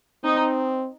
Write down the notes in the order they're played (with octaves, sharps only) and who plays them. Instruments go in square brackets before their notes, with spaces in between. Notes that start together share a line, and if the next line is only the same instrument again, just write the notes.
[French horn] C4 [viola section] D#4